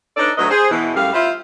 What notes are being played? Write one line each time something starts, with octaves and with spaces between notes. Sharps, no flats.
D4 D#4 A4 B4 C#5 D5
D2 F#3 A3 D4 B4 D#5
G#4 C5
B2 E3
F#2 G3 A3 F5
E4 F4 C5 E5 F5